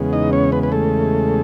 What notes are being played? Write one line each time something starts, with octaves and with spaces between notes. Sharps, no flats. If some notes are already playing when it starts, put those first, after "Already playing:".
Already playing: E2 C#3 G#3 B3
D#4 D#5
C#4 C#5
B3 B4
B4
A3 A4